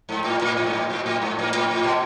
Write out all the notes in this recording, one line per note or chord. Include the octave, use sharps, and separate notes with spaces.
G#2
A2
A#2
A2
A2
G#2
A2
A#2
A2
G#2
A2
A2
A2
B2